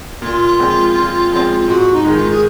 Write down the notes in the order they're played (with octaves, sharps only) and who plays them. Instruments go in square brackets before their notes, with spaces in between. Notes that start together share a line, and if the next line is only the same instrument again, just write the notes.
[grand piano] A#2 [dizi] F4
[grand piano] F3 G#3 C4
A#2
F3 G#3 C4
[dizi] F4
[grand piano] G#2 [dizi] F#4
[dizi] D#4
[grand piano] D#3 G#3
[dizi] F4
G#4